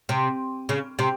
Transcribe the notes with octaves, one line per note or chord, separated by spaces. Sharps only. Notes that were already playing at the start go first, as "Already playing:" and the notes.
C3
C#3
C3